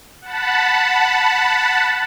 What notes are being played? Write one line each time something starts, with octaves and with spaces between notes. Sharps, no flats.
F#5 A5 B5